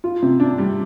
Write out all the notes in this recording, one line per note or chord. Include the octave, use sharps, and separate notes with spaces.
F4
C3
D4
G3